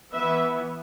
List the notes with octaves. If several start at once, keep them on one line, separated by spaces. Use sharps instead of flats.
E3 B3 B4 E5